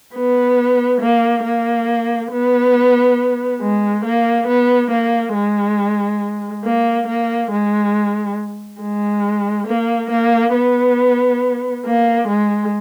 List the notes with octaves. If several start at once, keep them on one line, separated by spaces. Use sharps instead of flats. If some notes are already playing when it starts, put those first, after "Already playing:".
B3
A#3
A#3
B3
G#3
A#3
B3
A#3
G#3
A#3
A#3
G#3
G#3
A#3
A#3
B3
A#3
G#3